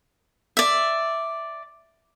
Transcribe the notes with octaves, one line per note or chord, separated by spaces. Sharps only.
D5 E5